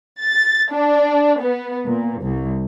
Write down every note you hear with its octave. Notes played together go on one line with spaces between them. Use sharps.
A6
D4
B3
A#2
C2